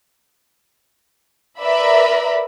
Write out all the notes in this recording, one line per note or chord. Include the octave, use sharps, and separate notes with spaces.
A#4 B4 D5 E5 B5